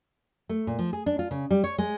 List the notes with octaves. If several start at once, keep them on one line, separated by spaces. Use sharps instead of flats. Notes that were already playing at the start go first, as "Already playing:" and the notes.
A3
A#2
F3
G#4
D4
F4
C#3
G3
C#5
G#3